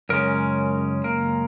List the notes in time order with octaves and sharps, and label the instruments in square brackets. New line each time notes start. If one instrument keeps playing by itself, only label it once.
[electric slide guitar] F#2 C#3 G#3 C#4 A#4
A#3 A#4